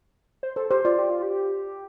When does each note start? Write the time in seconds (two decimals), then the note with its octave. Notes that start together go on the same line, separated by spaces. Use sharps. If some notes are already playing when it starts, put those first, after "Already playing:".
0.43 C5
0.56 A4 C5
0.71 G4 C5
0.85 F4 D5
0.98 G4
1.10 F4
1.22 G4